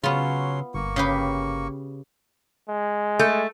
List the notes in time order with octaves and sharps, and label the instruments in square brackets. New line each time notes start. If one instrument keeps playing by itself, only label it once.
[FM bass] C#3 [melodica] F#3 C#4 C6 [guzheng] B3 F4
[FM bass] G1 [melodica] A#3 C#6
[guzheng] C#3 G4 B4
[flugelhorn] G#3
[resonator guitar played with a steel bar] A3